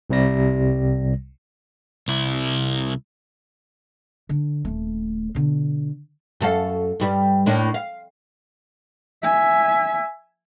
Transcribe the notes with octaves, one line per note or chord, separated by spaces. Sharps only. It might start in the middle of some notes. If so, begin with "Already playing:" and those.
C2 C3 G3 A#6
C2 E4
D3
D#1 A3
B2 D3
F#2 A4 F5
G2 G3
A2 A#3 D4
F5
E5 G#5